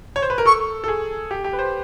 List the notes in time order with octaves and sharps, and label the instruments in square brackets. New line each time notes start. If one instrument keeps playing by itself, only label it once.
[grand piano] C#5
C5
B4
A#4
[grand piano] A4 [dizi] C#6
[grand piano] A4
G#4
G4
G4
B4
C5